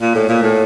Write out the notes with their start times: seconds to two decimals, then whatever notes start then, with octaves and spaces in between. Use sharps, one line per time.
0.01 A#2
0.15 A2
0.29 A#2
0.43 A2